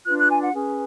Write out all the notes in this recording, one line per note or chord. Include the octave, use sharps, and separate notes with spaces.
D4 F4 B4 F#6
F#6
G#5
F#5
C#4 G#4 B4